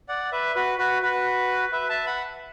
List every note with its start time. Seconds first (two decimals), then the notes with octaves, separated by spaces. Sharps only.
0.09 D5 F#5
0.32 B4 E5
0.55 F#4 B4
0.78 F#4 B4
1.02 F#4 B4
1.72 B4 E5
1.89 E5 A5
2.06 F#5 B5